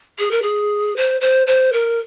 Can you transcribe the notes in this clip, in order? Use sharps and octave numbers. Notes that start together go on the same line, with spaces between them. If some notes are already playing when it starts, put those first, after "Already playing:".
G#4
A#4
G#4
C5
C5
C5
A#4